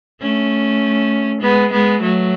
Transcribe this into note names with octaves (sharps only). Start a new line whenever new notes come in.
A3 C#4
G#3 B3
G#3 B3
F#3 A3